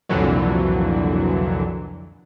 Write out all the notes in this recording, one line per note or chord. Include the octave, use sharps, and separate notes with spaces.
C2 F2 A#2 D3 E3 F#3